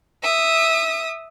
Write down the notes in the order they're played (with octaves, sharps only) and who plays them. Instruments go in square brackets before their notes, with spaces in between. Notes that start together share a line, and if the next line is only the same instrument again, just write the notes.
[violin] E5 D#6